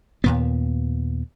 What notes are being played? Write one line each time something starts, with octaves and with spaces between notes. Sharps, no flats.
D#2 A#2 B3